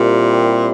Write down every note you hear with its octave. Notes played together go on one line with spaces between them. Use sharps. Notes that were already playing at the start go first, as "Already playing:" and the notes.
Already playing: A#2 G3 C4 E4 G4 A#4